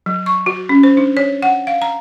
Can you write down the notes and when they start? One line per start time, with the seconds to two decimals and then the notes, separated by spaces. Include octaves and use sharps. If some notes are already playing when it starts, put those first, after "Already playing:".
0.06 F#3
0.26 C#6
0.46 F#4
0.69 C#4
0.83 C5
0.97 D4
1.17 C#5
1.42 F#5
1.67 F5
1.82 A#5